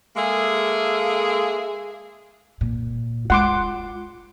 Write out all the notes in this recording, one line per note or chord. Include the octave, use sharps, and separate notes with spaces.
G#3 A#3 G#4 A4 E5
A#2
G#3 F4 F#5 C6 D6